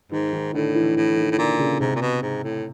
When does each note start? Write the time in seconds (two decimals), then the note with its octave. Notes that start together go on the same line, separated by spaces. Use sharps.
0.12 G#2 D#3
0.33 D#3
0.54 A2 D3
0.75 E3
0.96 A2 E3
1.17 D#3
1.31 A2
1.38 A#2 D3
1.59 C#3
1.80 G#2 C3
1.96 A#2
2.02 B2
2.22 G#2
2.43 A2